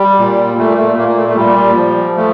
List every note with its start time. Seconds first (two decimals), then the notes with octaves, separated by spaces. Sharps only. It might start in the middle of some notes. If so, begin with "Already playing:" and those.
Already playing: G3
0.19 A#2
0.57 A#2 A3
0.78 A3
0.98 A#2 A#3
1.08 A#3
1.17 A3
1.28 A3
1.36 A#2 G3
1.76 F3
2.16 F3 A3